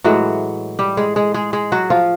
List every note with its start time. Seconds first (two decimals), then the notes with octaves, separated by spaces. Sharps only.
0.04 A2 E3 F#3 G#3 F#4
0.79 G3 G4
0.97 G#3 G#4
1.16 G#3 G#4
1.34 G#3 G#4
1.53 G#3 G#4
1.72 F#3 F#4
1.90 F3 F4